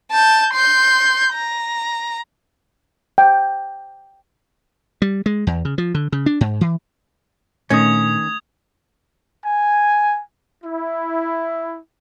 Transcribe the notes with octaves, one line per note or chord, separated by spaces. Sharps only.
A5 G6
C6 G6
A#5
G5
G3
G#3
E2
C#3
F3
D3
C#3
D4
G#2
E3
A#2 D#3 A3 C#4 D4 D#6 G#6
G#5
E4